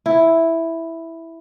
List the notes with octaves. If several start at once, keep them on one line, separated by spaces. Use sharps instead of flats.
E4